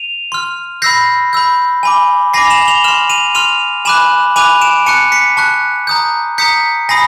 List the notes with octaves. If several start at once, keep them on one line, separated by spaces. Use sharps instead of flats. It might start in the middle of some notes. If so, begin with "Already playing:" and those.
Already playing: D#7 F7
C6 F6
B5 E6 G6 A#6 C7
B5 E6 G6
G#5 B5 D6
G#5 B5 D6 A#6 C7
F7
E7 F#7
F7 G7
C6 F6 E7 F#7
D#7 F7
C6 F6 D#7 F7
G#5 B5 D6 F#6 E7 F#7
G#5 B5 D6 F#6 D#7 F7
D7 E7
A5 C#6 F#6 C#7 D#7
B6 C#7
A5 C#6 F#6
A#5 D#6 G6
A#5 D#6 G6 B6 C#7
G#5 B5 D#6 A#6 C7